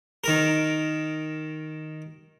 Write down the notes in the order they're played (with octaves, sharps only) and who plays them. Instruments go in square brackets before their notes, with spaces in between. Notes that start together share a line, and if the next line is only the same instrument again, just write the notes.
[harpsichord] D#3 A#4